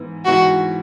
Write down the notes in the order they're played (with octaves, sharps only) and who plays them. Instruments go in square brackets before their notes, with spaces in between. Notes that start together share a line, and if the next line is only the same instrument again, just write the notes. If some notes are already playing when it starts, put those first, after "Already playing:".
Already playing: [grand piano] G#2 E3 B3 E4
[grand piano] G#2 E3 B3 E4 [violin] F#4